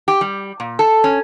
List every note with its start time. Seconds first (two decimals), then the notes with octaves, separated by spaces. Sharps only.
0.08 G4
0.21 G3
0.60 A#2
0.79 A4
1.04 C#4